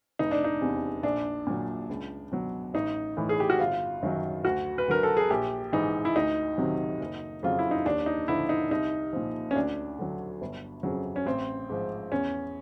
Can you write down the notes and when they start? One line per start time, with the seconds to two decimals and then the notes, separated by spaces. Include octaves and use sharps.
0.19 F1 D#4
0.31 D4
0.44 D#4
0.61 E2 C3
1.03 A#1 D4
1.47 A#2 F#3
1.89 C#2
2.32 B2 F#3
2.74 A1 D#4
3.17 A2 E3
3.29 G#4
3.40 G4
3.50 F#4
3.59 G1 F4
4.02 F#2 D#3 F#3
4.44 D2 F#4
4.78 B4
4.88 D3 F#3 A#4
5.03 A4
5.17 G#4
5.30 A#1 G4
5.72 G#2 E3 D#4
6.05 E4
6.16 D2 D#4
6.58 C3 D#3 F#3
7.01 F#1
7.43 F2 C#3 F#3 F4
7.59 E4
7.71 D#4
7.86 D#2 D4
8.06 D#4
8.28 D3 F3 E4
8.49 D#4
8.71 C2 D#4
9.13 A#2 F3
9.51 C#4
9.55 D2 D4
9.99 D3 F#3
10.41 G1
10.83 F2 C#3 F#3
11.16 C#4
11.26 A1 C4
11.70 G#2 F3
12.12 E2 C#4